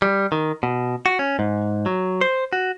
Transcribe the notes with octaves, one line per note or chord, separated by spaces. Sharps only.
G3
D#3
B2
F#4
C#4
G#2
F#3
C5
F#4